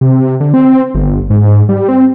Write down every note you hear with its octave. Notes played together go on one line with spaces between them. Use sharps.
C3
D3
C4
G1
G#2
G3
C4